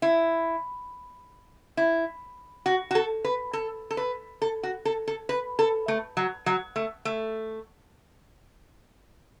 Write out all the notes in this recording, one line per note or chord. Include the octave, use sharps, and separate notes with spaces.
E4
E4
F#4
F#4
A4
B4
A4
A4
B4
A4
F#4
A4
A4
B4
A4
A3
F#3
F#3
A3
A3